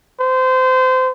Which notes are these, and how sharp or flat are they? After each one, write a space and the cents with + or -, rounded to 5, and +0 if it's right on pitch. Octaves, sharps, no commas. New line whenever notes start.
C5 -25